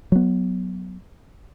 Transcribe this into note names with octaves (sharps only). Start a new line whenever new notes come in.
F#3 B3